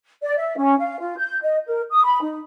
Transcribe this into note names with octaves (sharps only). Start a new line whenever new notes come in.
D5
E5
C#4
F5
F4
G6
D#5
A#4
D#6
B5
D#4